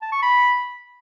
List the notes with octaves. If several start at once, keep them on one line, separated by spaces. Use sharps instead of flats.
A5
C#6
B5